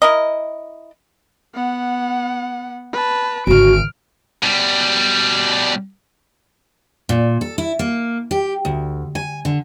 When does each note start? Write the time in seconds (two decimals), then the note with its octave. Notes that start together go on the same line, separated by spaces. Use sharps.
0.02 E4 A#4 D#5
1.55 B3 F#5
2.93 B4 A5
3.47 G#1 D3 F#4 F6 D7
4.43 B2 G3
7.09 A#2
7.41 A4
7.58 E4
7.79 A#3
8.31 G4
8.65 D2
9.15 G#5
9.45 D3